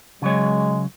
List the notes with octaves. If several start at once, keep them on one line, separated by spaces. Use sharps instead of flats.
C#3 F#3 G#3 C#5